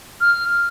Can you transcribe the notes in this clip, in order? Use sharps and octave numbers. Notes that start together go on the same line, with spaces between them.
F6